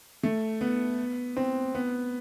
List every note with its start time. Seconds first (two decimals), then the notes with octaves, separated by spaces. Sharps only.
0.24 A3
0.61 B3
1.37 C4
1.75 B3